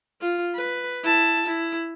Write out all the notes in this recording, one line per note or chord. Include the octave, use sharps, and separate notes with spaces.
F4
B4
E4 A5
E4